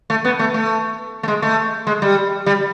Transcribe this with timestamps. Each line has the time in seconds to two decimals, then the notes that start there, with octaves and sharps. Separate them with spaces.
0.10 A3
0.25 B3
0.39 A3
0.54 A3
1.23 A3
1.28 G#3
1.42 A3
1.87 G#3
2.02 G3
2.46 G3